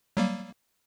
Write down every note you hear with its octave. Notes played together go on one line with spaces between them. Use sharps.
F#3 G3 A#3